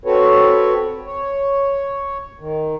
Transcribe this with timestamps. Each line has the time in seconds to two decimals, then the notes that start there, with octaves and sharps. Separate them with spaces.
0.05 C4 F#4 A4 B4 C#5
1.06 C#5
2.39 D#3